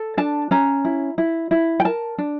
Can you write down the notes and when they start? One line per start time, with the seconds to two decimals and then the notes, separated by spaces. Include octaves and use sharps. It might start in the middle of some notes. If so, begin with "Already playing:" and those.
Already playing: A4
0.17 D4 A5
0.51 C#4 A#5
0.85 E4
1.18 E4
1.51 E4
1.80 G5
1.85 A#4 A5
2.18 D4